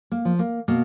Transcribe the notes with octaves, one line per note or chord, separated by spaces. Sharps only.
A#3
F3
A#3
B2 A#3